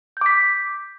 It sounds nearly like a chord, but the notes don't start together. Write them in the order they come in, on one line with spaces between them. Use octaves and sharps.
G6 D6 B6